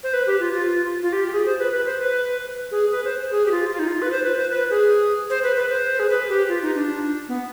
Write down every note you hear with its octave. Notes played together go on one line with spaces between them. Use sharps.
C5
B4
G4
F4
F4
F4
G4
G4
G#4
C5
B4
B4
C5
B4
G#4
B4
C5
G#4
G4
F4
F4
D#4
F4
B4
C5
B4
C5
B4
G#4
C5
B4
B4
C5
G#4
B4
G4
F4
D#4
D4
B3